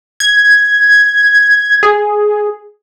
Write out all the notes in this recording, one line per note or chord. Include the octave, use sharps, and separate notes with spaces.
G#6
G#4